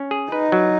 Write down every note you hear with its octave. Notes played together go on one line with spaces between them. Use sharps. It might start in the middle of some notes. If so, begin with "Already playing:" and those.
Already playing: C#4
G#4
D#4 B4
F#3